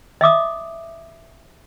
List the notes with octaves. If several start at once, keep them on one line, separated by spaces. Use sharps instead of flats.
D#5 E5 D6 D#6